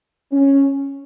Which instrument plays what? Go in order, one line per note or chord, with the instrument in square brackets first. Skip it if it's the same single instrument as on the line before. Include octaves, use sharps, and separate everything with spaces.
[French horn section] C#4